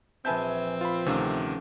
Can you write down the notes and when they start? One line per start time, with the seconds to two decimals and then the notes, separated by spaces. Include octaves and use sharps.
0.25 A#1 C4 B4 E5 G#5 A5 G6
0.81 F4 B5
1.06 D2 C3 D#3 C#4 A4 F5